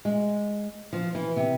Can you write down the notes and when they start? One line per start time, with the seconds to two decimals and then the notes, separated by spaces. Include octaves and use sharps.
0.05 G#3
0.93 F3
1.15 E3
1.36 C3